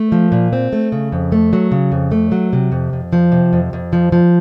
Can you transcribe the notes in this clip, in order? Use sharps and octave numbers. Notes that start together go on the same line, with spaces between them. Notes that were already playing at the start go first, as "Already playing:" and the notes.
Already playing: A3
F3
A#2
C4
A3
C#3
F2
A3
F#3
C#3
F2
A3
F#3
C3
F2
F2
F3
C3
F2
F2
F3
F3